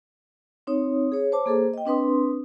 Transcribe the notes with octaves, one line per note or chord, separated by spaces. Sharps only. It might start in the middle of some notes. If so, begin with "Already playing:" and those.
C4 D#4 C#5 D#6
G#4 C#5
C5 C#5 A5 D6
A#3 G#4 A4 C5
D#5 G5
C4 D4 B4 C6 D#6